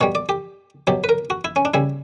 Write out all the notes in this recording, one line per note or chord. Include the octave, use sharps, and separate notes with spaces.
B2 G3 C#5
D5
G4
B2 F#3 G4
B4
A#4
F#4
E4
C#4
D4
C#3 G3 E4